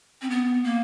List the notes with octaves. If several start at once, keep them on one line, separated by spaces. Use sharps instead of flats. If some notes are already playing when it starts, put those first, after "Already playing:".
C4
B3
A#3